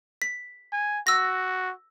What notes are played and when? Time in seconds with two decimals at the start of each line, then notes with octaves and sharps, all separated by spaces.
0.22 B6
0.72 G#5
1.07 F#4 E6 A#6